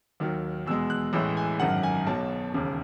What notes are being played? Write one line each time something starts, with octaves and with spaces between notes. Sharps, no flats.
D#2 D#3 F#3
E2 B2 G#3 E6
F#6
A1 A2 E3 G#3 E6
G#5
G#1 F#2 D#3 F#5
G#5
B1 B2 F#3 A5
E1 D#2 C#3